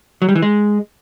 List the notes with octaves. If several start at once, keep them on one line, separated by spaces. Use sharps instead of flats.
F#3
G3
E3
G#3